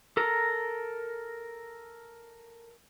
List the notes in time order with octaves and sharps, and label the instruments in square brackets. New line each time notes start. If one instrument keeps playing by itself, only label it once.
[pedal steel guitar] A4 A#4 A#5